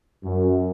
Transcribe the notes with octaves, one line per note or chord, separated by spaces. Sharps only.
F#2